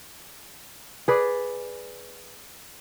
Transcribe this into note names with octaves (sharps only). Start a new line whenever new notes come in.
G#4 B4 D5